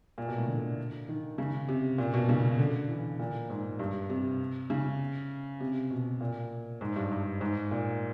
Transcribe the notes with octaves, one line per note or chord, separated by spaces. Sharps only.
A#2
B2
A2
D3
D#3
C#3
C3
A#2
B2
C#3
D3
E3
A#2
G#2
G2
C3
C#3
C3
B2
A#2
G#2
G2
G2
G#2
A#2